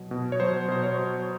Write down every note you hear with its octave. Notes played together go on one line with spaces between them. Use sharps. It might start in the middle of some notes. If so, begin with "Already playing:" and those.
Already playing: B2 F#3
B2
C#5
F#3 C5
B2 C5
C#5
F#3